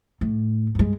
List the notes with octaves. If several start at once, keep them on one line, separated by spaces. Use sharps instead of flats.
A2
G2 G#3